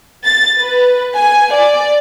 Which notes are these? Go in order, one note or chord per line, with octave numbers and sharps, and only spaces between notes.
A6
B4
G#5
D5